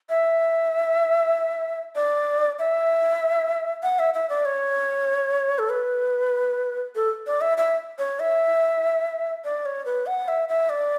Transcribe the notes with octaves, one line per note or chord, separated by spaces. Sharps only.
E5
D5
E5
F#5
E5
E5
D5
C#5
A4
B4
A4
D5
E5
E5
C#5
E5
D5
C#5
B4
F#5
E5
E5
D5